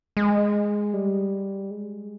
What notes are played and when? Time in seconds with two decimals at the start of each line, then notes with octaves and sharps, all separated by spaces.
0.17 G#3
0.94 G3
1.71 G#3